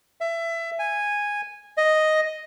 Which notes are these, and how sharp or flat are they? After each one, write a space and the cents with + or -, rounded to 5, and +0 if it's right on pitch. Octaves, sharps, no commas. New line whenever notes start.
E5 +20
G#5 -10
D#5 +0